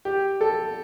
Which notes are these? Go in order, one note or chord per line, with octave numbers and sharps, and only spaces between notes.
G4
A4